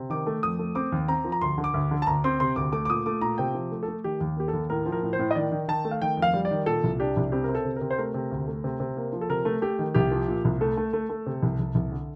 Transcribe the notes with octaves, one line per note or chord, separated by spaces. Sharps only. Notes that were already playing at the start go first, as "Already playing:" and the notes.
Already playing: C3
D#3 D6
A3
F2 D#6
A3
C4 D6
D#2
C4 A#5
F3
A#5
D2 C6
D3
D6
D2
D3
A5
D2 A#5
C4 C6
C3 C6
D2 D6
A3 D6
D6
A#2 D#6
A3 D6
A#2 A#5
C3 G5
F3
A3
A4
A3
D#3 G4
D#2
A#3 G4
D#2 A4
A2 A#4
F3
A#4
A2
C5
A2
D#5
D#3 D5
D#3
D#3 A5
A3
F5
D#3 G5
F2
F5
G3
D5
D#3
A#2 A4
C2
D4 G4
C2
C4 G4
A#4
C4
A4
C3
C3 A#4
C5
A3 A#4
C3
D2
A3
C3
C3
A#3
F3
A4
C3 A#4
A3
A3 G4
D#3
C2 G4
F3
A#2
C2
A3 A4
A3
A3
A3
C3
C2
C2
C2
D3